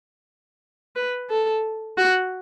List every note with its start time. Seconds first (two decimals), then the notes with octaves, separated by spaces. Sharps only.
0.96 B4
1.30 A4
1.98 F#4